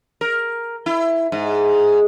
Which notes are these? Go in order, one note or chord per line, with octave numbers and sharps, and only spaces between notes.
A#4
E4
G#2